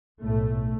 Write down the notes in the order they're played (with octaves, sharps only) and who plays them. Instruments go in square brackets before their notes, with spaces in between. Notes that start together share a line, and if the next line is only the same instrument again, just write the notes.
[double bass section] B1 A2 A3